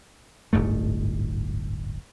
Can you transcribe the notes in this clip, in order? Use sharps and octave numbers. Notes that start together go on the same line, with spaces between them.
D1 G1 G#2 A3